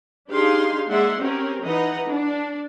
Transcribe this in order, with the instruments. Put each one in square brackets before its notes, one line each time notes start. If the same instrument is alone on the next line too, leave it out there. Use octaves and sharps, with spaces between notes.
[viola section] D4 D#4 G4 G#4 F5 C6
G#3 A#3 D5 E5 F#5 C6
C4 C#4 G4 A#4
E3 D#4 B4 D#5 F#5 A#5
D4